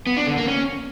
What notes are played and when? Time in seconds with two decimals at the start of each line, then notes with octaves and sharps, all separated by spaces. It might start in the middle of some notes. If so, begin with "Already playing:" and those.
0.07 B3
0.17 D4
0.27 D3
0.37 A#3
0.47 C#4